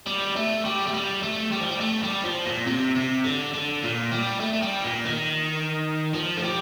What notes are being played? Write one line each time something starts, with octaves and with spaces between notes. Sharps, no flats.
G3
A3
G3
A3
G3
A3
G3
F3
G3
A3
G3
F3
A#2
C3
C3
D3
D3
A#2
G3
A3
A3
G3
A#2
D#3
F3
A3
G3